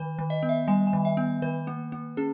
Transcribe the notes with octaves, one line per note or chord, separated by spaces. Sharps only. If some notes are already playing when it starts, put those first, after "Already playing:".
Already playing: D#3 B4
D#3
D#5
B3
E5
G3 G#5
G#5
D#3
E5
B3
D#3 B4
A#3
A#3
C#4 G#4